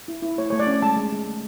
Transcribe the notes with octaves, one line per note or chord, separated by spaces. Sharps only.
E4
E4
A3 C#5
A3 C#5
D5
C#4
G#3 A5
G#3
G#3
A3